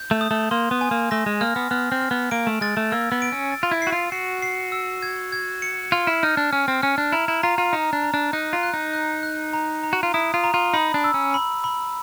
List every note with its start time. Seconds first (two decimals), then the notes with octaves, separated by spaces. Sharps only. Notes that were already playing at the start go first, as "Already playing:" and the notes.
Already playing: G6
0.11 A3
0.21 D#6
0.31 A3
0.51 A#3 C6
0.71 B3
0.81 G#5
0.91 A#3
1.11 A3 A#6
1.26 G#3
1.41 A#3 F6
1.56 B3
1.71 B3 F6
1.92 C4
2.01 F6
2.11 B3
2.31 A#3 D7
2.47 A3
2.61 G#3 A6
2.77 A3
2.92 A#3 E6
3.12 B3
3.22 D7
3.32 C#4
3.52 A6
3.63 F4
3.71 E4
3.82 F#4 C7
3.92 F4
4.12 F#4 C7
4.42 C7
4.72 E6
5.02 G#6
5.32 G#6
5.62 C#7
5.92 F4 F6
6.07 E4
6.23 D#4 F6
6.37 D4
6.52 C#4 F6
6.68 C4
6.82 C#4 F6
6.98 D4
7.12 E4 A#5
7.28 E4
7.43 F4 A#5
7.58 F4
7.73 D#4 A#5
7.93 D4
8.03 A#5
8.14 D4
8.33 D#4 F#6
8.53 F4
8.63 F#6
8.74 D#4
8.93 F#6
9.23 F#6
9.53 A#5
9.83 A#5
9.93 F#4
10.03 F4
10.14 E4 D#6
10.34 F4
10.44 A#5
10.54 F4
10.73 D#4 B5
10.94 D4
11.04 E6
11.14 C#4
11.34 B5
11.64 B5